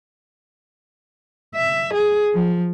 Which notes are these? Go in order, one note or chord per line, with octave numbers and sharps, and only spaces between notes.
E5
G#4
F3